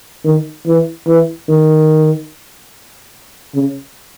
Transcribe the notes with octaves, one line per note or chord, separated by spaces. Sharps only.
D#3
E3
E3
D#3
C#3